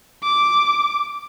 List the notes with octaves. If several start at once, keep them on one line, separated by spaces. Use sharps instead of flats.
D6